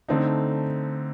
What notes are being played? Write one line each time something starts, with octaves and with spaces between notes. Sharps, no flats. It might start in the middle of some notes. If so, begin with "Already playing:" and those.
D3 A3 C4 D#4